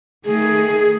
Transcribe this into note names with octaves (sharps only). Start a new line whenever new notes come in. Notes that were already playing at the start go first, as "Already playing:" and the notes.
D#3 A3 G#4